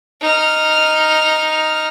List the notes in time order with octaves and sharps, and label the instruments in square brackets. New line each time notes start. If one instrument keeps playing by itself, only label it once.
[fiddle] D#4 F6